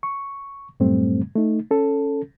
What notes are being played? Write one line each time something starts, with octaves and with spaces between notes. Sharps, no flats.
C#6
F#2 A2 G3 A3 C4
A3 D#4
C#4 A4